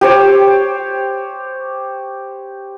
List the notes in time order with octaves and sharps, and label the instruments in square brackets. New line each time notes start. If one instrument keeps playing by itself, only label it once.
[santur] G4 C5 C#5